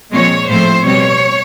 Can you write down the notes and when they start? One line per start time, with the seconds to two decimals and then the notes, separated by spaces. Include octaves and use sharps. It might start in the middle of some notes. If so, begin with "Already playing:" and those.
0.12 A#2 F3 G#3 C4 C#5
0.49 A2 F3 A3 C4 C5
0.84 B2 G3 C4 C#5